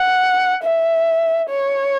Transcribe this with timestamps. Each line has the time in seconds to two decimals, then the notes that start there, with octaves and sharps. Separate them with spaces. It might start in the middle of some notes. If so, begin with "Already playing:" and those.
Already playing: F#5
0.63 E5
1.50 C#5